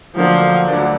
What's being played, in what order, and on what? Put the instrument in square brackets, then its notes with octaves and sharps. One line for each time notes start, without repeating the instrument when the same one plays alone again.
[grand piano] D2 D3 F#3 A#3 D4 [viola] F3
[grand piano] D2 D3 F#3 A#3 D4